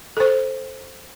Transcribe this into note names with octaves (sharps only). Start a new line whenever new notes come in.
A4 C5